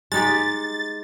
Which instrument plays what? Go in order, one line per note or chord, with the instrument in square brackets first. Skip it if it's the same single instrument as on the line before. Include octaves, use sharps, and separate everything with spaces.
[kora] G#3 D#4 G4 [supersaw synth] A6